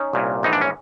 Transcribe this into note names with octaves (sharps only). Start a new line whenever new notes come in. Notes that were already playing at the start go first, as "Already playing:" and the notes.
Already playing: C#4 D#4
C2 A#2
A#1 G#2 E3 D#4
D4
C#4